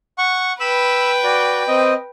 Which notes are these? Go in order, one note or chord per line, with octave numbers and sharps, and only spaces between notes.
F#5 C#6
B4 G5 B5 E6
F#4 D5
C4 D#5